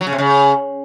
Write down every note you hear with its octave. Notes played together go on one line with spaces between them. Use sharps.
F#3
C#3
C3
C#3